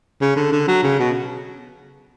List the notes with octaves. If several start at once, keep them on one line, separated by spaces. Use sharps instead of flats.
C#3
D3
D3
F#3
C#3
B2